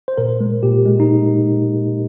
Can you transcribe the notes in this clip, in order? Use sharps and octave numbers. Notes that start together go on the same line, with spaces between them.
C5
A#2 A#4
G#3
A#2 G4
G#3
D#4